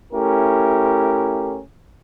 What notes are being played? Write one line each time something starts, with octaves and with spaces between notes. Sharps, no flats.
A3 C#4 E4 G4 A#4